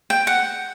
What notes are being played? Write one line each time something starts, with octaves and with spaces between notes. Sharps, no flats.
G5
F#5